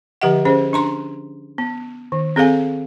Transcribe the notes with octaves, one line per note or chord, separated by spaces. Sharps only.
D3 F3 G4 E5 F#5
C#4 G#4 C5
D4 A#5 C6
B3
D#3
C4 G#4 A4 F5 G#5